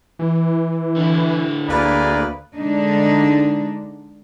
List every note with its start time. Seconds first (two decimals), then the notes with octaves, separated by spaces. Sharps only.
0.19 E3
0.97 D3 E4
1.69 D2 A#3 G#4 A#4 B4 D5 B5
2.55 D3 G#3 D4 D#4